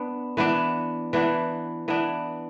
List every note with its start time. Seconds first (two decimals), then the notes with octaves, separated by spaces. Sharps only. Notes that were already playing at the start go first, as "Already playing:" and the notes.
Already playing: B3 D4
0.37 E3 B3 D4
1.13 E3 B3 D4
1.88 E3 B3 D4